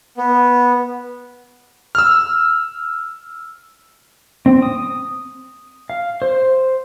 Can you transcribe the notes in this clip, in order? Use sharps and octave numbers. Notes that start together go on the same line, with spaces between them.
B3
E6 F6
C4
D#6
F5
C5